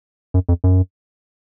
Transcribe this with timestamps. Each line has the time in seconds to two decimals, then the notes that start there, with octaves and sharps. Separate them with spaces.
0.34 F#2
0.49 F2
0.64 F#2